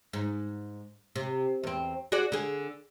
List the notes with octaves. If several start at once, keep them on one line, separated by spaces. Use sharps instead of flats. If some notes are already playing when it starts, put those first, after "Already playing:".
G#2
C3
E2 C4
F#4 G#4 D5
D3 G#4